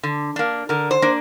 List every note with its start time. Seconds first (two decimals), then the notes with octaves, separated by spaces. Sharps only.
0.03 D3
0.36 A#3 D4
0.69 D3 A#4
0.91 C5
1.02 A#3 D4